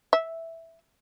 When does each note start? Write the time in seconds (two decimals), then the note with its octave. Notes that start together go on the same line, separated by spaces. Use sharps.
0.13 E5